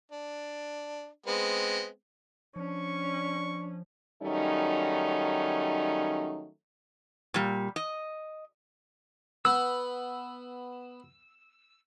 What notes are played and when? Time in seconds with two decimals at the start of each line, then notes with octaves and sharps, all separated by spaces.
0.12 D4
1.26 G#3 B3 C4
2.56 F3 C#4 D4 C#6
4.23 D#3 F#3 G3 A3 C#4 D#4
7.34 A#2 G3
7.76 D#5
9.45 B3 E6